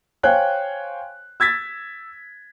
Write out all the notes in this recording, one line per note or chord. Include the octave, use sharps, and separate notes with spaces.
C5 C#5 F5 G5 G#5 F#6
E6 G#6 A6 B6